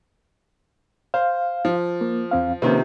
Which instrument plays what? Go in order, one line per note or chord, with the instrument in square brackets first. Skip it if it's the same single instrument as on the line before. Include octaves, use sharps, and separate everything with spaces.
[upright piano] C5 [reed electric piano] F5
[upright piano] F3
[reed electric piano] A#3
E2 C4 F5
[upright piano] C3 D#3 F3 [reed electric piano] A#3 C#4 B4